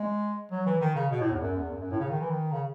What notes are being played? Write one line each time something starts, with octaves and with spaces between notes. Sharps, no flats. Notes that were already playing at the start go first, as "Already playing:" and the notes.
Already playing: G#3
F#3
E3
D#3
C#3
B2
A2
E2
F#2
E2
F#2
F#2
A2
C#3
D#3
E3
D#3
C#3